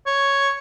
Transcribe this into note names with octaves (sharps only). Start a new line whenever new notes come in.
C#5